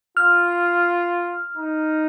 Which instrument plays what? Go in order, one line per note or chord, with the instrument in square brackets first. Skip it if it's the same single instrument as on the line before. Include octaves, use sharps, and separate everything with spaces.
[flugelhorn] F4 [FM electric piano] F6
[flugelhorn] D#4